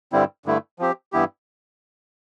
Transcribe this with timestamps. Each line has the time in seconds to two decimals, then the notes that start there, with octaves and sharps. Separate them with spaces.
0.12 G2 D3 G3 C4 E4
0.46 G2 D3 A3 E4
0.79 F3 C4 G4
1.13 G2 E3 B3 E4 G4